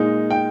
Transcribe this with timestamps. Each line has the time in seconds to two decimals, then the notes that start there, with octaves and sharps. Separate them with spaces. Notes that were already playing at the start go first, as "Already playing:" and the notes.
Already playing: A#2 G#3 D#4
0.31 G5